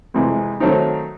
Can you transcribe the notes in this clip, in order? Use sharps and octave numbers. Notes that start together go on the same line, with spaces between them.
F2 C3 E3 G#3
D#3 F#3 A3 C4 D#4